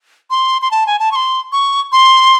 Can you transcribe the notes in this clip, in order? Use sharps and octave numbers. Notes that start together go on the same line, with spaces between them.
C6
C6
A5
G#5
A5
C#6
C6
C#6
C6